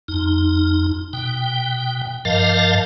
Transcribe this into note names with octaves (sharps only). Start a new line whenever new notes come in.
F2 D#4
B2 G5
G2 F3 A#4 D#5 F5 A5